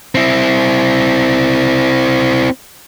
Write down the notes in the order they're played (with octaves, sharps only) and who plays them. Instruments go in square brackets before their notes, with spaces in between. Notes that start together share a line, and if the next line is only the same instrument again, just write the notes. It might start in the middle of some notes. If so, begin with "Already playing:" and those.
[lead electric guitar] C4 E4